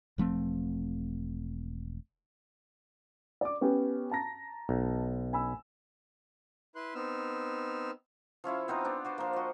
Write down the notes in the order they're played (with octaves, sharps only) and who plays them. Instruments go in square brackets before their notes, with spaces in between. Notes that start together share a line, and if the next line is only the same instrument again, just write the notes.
[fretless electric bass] E1 F3 A3 C4
[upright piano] D5 D6
B3 C#4 G4
A5 A#5 A#6
[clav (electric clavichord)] B1
[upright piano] G#5 B5 E6
[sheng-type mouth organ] E4 B4 C6 F#6
B3 C4 D#4 E6 F6
[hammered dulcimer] F3 C#4 E4 F4
B3 C4 D#4 B4
B3 D4
F#4 C5 D5
F3 A#3
F#4 D#5